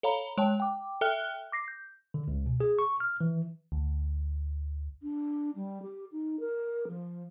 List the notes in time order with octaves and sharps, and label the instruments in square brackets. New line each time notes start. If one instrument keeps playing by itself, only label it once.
[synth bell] A4 C#5 F5 A#5 B5
G#3 C#5 G5 A5
G5 D6
A4 E5 G5 F6 F#6 G7
D6 A#6 C7
G6
[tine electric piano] D3
C#2
B2
G#4
C#6
F6
E3
[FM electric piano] D2
[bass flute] D4
G3
G4
D#4
A#4
F3